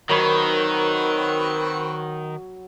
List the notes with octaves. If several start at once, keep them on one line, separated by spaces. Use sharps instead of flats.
D#3 F#3 C4 F#4 A#4 B4 C#5 B5